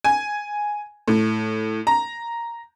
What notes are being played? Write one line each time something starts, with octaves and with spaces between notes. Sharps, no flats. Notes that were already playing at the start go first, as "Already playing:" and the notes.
G#5
A2
A#5